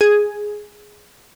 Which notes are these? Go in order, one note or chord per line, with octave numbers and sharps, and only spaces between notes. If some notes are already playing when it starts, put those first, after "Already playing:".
G#4